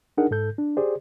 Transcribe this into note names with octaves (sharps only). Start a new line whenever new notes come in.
D4 D#4 G#4 A#4 F#5
G#2 A4 G6
D4
G4 G#4 C5 D5